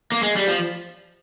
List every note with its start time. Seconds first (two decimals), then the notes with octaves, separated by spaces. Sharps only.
0.12 A#3
0.23 G#3
0.36 G3
0.47 F3